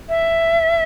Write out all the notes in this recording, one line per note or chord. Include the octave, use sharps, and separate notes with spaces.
E5